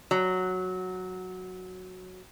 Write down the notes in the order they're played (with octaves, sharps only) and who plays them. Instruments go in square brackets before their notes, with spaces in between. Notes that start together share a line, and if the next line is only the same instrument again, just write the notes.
[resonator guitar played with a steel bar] F#3